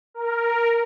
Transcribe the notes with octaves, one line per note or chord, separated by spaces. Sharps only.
A#4